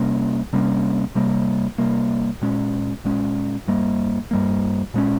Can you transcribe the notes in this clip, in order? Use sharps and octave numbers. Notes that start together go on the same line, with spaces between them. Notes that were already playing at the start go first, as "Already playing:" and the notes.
Already playing: C3 G3 A#3 C#4
C3 G3 A#3 C#4
C3 G3 A#3
C3 G3 A#3
A#2 G#3 C#4
A#2 G#3 C#4
G2 G3 A#3
G2 G3 A#3
A#2 G#3 C#4